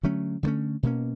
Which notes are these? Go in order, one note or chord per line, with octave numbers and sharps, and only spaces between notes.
D3 F#3 A3 C#4
D3 F#3 A3 C#4
B2 G3 A#3 C#4